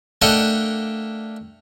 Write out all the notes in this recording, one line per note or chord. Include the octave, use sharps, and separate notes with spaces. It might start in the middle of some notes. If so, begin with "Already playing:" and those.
A3 A#3 D4 D#5 F#5 G5